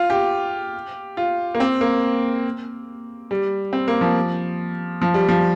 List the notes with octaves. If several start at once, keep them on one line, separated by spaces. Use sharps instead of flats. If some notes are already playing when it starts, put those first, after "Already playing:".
Already playing: F4
G4
F4
A#3
C4
A#3
G3
C4
A#3
F3
F3
G3
F3